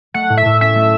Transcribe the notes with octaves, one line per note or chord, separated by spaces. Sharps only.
A3 F#5
A2
E5
A2
C#4 E5
A3